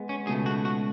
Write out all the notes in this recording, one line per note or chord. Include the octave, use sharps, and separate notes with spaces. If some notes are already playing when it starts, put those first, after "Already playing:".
Already playing: G#3 B3
C#4
C#2 B2 A3 G#4
F#4
F#4